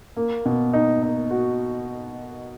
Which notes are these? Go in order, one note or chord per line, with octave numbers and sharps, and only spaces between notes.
A#3
B2
D#4
D#4
F#4